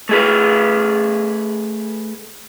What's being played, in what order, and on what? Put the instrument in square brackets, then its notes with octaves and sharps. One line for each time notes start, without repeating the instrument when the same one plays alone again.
[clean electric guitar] A3 G#4 B4